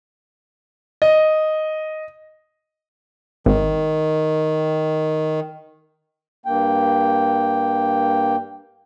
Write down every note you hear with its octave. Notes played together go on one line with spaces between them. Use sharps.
D#5
G#1 D#3
G2 A#3 G5